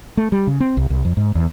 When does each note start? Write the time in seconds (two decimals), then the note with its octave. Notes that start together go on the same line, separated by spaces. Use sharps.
0.17 A3
0.32 G3
0.47 C#3
0.60 C4
0.77 C2
0.90 C2
1.05 F2
1.17 G#2
1.35 E2